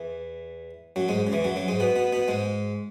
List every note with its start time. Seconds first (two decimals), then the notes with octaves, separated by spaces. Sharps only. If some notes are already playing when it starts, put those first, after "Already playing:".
Already playing: E2 E3
0.96 F#2 F#3
1.08 G#2 G#3
1.27 C#3
1.32 E2 E3
1.44 F#2 F#3
1.56 F#2 F#3
1.68 G#2 G#3
1.80 B2 B3
1.96 B2 B3
2.13 B2 B3
2.28 G#2 G#3